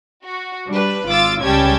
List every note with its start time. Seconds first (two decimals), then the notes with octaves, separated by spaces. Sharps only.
0.23 F#4
0.68 G3 D4 B4
1.08 G#1 F4 D6 E6 A6
1.42 C#2 G3 C#4 G5 A5 G#6